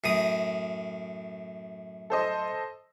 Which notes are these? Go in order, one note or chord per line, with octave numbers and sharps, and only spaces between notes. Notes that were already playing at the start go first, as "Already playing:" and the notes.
F#2 A2 D#6
A4 C5 D#5